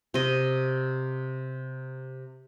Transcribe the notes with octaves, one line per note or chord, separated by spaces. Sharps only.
C3 D#5